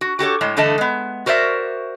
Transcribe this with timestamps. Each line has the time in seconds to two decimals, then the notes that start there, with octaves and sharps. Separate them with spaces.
0.01 F#4
0.19 F#4 G4 A4 C#5
0.41 A2 G#3 C#5
0.57 G2 D3 E3 A3 D#5 A5
0.78 G#3 B3
1.26 F#4 A#4 C5 D5 E5